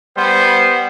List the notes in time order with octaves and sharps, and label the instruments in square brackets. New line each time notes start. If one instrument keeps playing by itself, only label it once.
[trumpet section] G3 B3 C5